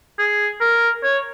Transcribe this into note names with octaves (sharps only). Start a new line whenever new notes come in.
G#4
A#4
C#5